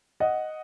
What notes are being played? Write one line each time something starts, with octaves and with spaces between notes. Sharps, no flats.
D#5 F#5